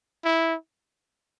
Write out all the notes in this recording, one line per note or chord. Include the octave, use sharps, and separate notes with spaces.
E4